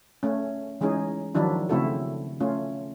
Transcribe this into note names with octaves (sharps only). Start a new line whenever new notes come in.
A3 C#4
E3 G#3 C#4 D#4 G#4
D#3 F3 F#3 D4 E4
C#3 A3 C4 E4 F#4 A4
A3 C#4 F4